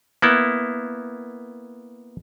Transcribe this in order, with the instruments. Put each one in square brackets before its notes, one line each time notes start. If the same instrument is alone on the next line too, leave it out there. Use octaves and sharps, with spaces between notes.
[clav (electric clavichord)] A#3 B3 E4